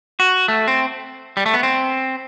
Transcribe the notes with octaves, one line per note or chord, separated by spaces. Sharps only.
F#4
A3
C4
G3
A3
B3
C4